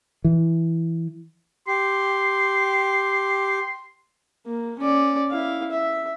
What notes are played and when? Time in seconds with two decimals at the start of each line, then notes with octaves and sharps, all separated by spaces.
0.24 E3
1.68 G4 C6
4.46 A#3
4.79 C#4 D5
5.31 E4 F5
5.71 E5